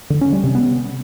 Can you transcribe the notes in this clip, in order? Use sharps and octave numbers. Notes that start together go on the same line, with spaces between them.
D3
C#4
G3
C3
B3